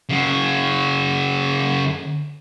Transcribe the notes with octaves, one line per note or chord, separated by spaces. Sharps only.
C#3 F#3